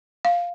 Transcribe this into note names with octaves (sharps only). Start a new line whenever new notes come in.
F5